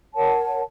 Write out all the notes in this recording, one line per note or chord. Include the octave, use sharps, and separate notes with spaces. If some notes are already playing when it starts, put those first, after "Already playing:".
A#4 C#5 F#5 A5